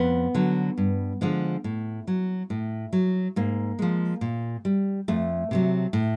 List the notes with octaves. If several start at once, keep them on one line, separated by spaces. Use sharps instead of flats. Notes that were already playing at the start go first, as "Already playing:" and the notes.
Already playing: F2 B3
D3 F#3
G2
D3 F3 G#3
A2
F#3
A2
F#3
G#2 A#3
F3 G#3
A#2
G3
F2 A3
C3 D#3 F#3
A2